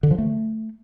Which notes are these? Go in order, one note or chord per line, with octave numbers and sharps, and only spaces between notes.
D3
F3
A3